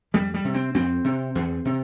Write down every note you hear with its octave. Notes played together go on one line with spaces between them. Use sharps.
F2 G3
G3
C3
C4
F2 C4
C3
E2
C3